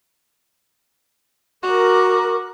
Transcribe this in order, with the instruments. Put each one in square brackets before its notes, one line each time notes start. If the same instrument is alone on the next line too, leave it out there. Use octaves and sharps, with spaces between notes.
[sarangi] F#4 [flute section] A#4 D6